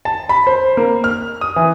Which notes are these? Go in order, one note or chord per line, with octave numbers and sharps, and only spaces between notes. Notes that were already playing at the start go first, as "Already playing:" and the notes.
A5
B5
C5
A#3
F6
D#6
E3